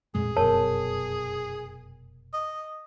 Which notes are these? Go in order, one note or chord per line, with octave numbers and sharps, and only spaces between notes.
F2 A#2 G#3 G#4
F1 F#2 B2 A#4 C#5 A5
D#5